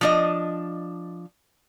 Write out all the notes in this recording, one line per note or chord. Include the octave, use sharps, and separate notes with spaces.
F3 D4 D#5